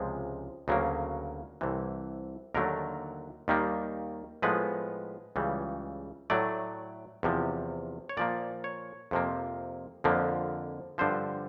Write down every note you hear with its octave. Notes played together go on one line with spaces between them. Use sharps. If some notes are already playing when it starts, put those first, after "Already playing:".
Already playing: C#2 C3 F3 G#3
D2 C#3 F#3 A#3
C2 C3 E3
D#2 D3 F#3 A3 A#4
D#2 D#3 G3 A#3
A2 F3 G#3 B3 B4
C#2 C#3 E3 G3
A2 F#3 A3 D5
E2 C3 F3
C#5
A#2 F3 A#3 D5
C#5
F2 C3 F3 A#3
F2 D3 F3 A#3
G2 D3 F3 C5